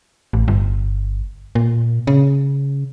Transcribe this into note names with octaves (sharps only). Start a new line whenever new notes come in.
A1
G1
A#2
C#3